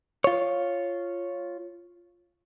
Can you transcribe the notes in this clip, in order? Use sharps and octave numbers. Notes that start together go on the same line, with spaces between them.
F4 C#5